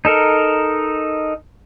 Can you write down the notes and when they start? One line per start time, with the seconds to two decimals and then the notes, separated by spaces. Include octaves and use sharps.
0.05 D#4 A4 A#4